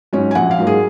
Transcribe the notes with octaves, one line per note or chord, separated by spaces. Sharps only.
G#2 F#3 C#4
G#5
A#1 F#5
F5
G#2 F#3 A#3
G#4